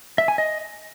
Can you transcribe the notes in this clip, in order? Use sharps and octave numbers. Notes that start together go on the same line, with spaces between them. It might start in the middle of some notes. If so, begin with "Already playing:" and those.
E5
G#5
D#5